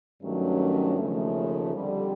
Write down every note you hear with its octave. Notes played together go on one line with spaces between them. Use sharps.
G2 D#3 F#3 A3 C#4
D#2 C#3 F3 A3
F2 D3 G3